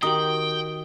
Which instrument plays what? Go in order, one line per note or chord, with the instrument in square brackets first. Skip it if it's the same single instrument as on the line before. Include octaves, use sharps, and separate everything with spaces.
[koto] D#3 [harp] F#4 G4 [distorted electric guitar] G5 [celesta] D#6 F#7